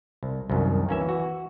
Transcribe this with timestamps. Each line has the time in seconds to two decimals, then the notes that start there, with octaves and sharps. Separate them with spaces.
0.23 C2
0.50 C2 F#2 D#3
0.89 E3 A#3 C#4 E5
1.09 F#4